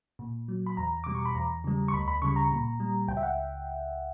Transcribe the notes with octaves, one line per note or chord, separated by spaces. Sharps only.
A#2
F#3
B5
E2 A#5
B2 G3 D6
C#6
B5
E2 A#5
C#3 G3
C#6
D2 B5
B5
C#3 G3 C#6
A#5
A#2
G3
C#2 G5
E5
F#5